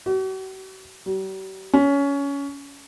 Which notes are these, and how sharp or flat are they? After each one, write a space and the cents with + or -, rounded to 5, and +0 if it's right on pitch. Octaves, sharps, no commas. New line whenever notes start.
F#4 +45
G3 -45
C#4 +20